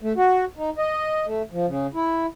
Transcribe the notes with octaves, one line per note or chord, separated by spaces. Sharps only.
A3
F#4
D#4
D#5
A3
F3
C#3
E4